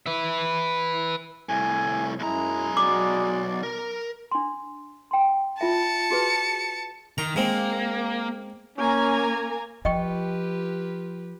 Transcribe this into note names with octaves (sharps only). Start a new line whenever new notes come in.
B4 E5
C2 A2 G#5
B1 F#2 G#3 E4 A#5
F#4 D5 D6
A#4
D4 C6
G5 C6
F4 E5 A5 C#7
F#4 G#4 B4
D#3 A#5
G#3 A#3 C4
A#3 C#4 G#5 A#5
F3 F4 G4 B4 D#5 G5 C#6